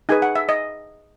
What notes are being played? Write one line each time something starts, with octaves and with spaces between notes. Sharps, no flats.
D#4 G#4 B4 G#5
F#5
E5
D#5